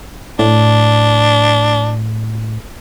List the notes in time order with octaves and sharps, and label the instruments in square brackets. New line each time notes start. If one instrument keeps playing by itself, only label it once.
[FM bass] A2 [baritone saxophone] D4